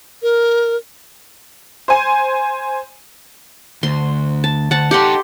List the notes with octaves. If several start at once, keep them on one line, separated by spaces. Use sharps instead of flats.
A#4
C5 G#5
D2 C6
A5
D2 F#5 A5
D#4 G4 A4 F#5 C6